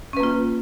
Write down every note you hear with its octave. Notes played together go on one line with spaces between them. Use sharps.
A#3 C#4 F4 B4